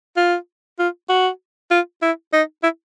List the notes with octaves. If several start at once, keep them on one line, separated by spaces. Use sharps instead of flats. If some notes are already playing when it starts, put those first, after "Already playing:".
F4
F4
F#4
F4
E4
D#4
E4